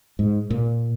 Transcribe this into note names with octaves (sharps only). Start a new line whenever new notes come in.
G#2
A#2